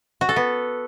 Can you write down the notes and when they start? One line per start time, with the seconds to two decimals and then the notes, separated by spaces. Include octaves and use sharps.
0.21 F#4
0.29 A4
0.36 B3